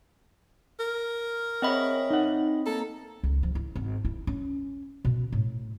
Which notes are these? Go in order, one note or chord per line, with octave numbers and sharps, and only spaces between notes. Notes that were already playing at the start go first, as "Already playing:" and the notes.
A#4
C4 G#4 C#5 D#5 E5 F#5 B5
D#4 F#5
A#3 A4 A#5
C#2
F3
E4
G#1
E4
C#4
B2
A2